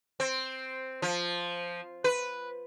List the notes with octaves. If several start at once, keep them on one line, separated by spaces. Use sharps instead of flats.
C4
F3
B4